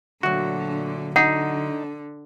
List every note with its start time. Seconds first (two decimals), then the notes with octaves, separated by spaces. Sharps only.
0.23 D2 A#2 D3 F#3 F#4
1.16 D3 D#4 F#5